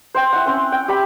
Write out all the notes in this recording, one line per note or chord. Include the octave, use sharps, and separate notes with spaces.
C5 G5
E4 F#5
C4 C#4
G5
G4 B5